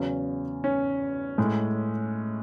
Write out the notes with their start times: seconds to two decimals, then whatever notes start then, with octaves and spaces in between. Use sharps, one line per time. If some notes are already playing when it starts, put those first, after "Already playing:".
Already playing: E2 C#3 F#3 C#4
0.64 C#4
1.38 A2 G#3